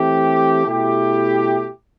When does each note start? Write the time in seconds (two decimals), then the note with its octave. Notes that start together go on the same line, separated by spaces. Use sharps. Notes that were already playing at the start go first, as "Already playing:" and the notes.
Already playing: E3 A3 C4 G4
0.64 B2 A3 E4 G4